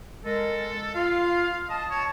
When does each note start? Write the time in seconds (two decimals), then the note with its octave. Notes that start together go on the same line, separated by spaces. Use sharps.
0.24 G#3 A4 A#4
0.94 F4 F5
1.69 D#5 A5
1.90 C#5